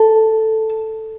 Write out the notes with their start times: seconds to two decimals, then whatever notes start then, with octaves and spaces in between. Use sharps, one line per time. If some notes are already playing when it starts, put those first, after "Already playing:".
Already playing: A4